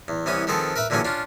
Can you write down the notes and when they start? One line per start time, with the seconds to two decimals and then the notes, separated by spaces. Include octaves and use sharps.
0.08 E2
0.26 C2 E3 B3 C#4 D#6
0.47 D#3 F3 B3 C4 G#4 A4
0.76 A#4 B4 E5 A#5
0.90 A#2 D3 E3 F#3 C#4 G#4
1.05 C#4 D4 F4